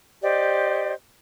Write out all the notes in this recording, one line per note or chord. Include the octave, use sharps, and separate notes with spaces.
G4 C5 D5 D#5